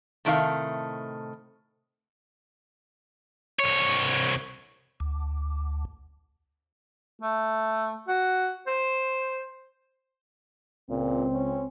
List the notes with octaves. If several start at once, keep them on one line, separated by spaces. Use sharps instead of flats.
A2 C3 D#3 A3 B4 F5
C2 C#5
D2
A3
F#4
C5
C#2 A#2 C4
C#4